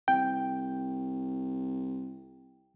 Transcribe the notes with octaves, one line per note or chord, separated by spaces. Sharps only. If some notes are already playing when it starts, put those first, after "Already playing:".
C2 G5